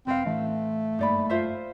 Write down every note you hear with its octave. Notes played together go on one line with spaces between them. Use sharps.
E1 C4 B4 F5
A1 E3 A3 D4
F#1 G2 A#3 D#4 D5 B5
F4 C5 E5